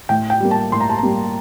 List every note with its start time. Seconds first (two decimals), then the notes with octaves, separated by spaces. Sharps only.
0.09 A2 G5
0.30 G5
0.40 G3 A#3
0.51 A5
0.72 A2 C6
0.80 A#5
0.90 A5
0.98 A#5
1.03 G3 A#3